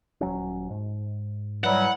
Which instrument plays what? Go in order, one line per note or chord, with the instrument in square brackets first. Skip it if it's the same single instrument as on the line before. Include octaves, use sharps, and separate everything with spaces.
[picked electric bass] D#1 F#3 C#4
G#2
[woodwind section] E3 F#3 G3 [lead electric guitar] F#5